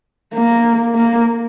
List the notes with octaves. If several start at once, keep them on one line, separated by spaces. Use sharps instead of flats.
A#3
A#3